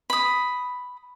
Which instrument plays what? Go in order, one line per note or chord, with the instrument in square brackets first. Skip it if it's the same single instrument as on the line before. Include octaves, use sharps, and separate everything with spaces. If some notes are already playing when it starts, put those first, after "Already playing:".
[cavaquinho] B5 D#6